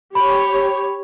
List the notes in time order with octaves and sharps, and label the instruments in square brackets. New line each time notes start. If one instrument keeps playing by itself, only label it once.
[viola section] G4 C#5 [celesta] B5